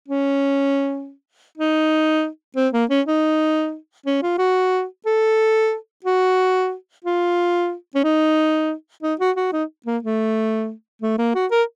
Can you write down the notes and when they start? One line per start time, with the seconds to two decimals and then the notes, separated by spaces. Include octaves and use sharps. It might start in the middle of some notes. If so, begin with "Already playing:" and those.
0.08 C#4
1.58 D#4
2.56 C4
2.73 A#3
2.90 C#4
3.07 D#4
4.06 C#4
4.23 F4
4.38 F#4
5.06 A4
6.05 F#4
7.05 F4
7.95 C#4
8.04 D#4
9.03 D#4
9.20 F#4
9.36 F#4
9.52 D#4
9.86 A#3
10.02 A3
11.02 A3
11.18 A#3
11.35 F#4
11.51 A#4